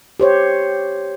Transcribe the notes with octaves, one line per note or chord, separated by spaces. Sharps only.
G4 C5 C#5